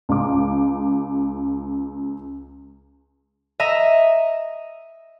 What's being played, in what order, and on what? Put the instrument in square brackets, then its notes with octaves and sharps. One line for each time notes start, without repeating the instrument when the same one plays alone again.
[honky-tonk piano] C#2 D6
[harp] D#5 E5 A#5